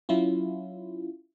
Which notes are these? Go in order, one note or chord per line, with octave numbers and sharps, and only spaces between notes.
F#3 C#4 E4 F4